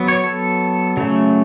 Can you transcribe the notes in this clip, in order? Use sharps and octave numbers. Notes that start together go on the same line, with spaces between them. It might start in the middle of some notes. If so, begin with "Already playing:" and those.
Already playing: F#3 B3
C#5
A4
C#3 F#3 A3